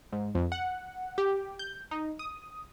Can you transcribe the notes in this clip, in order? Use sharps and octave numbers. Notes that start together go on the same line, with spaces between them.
G#2
F2
F#5
G4
G6
D#4
D#6